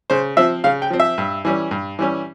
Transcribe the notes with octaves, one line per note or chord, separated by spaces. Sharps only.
C#3 C5
F3 C4 E5
C#3 F5
G5
F3 C4
E5
G2
E3 G3 C#4
G2
E3 G3 C#4